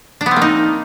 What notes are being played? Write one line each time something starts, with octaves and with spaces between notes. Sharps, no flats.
D4
B3
C4
A#3
D#4